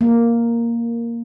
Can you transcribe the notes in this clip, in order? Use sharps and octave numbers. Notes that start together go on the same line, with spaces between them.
A#3